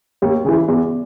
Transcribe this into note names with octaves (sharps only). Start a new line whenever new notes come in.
D#2
C#3 E3
E2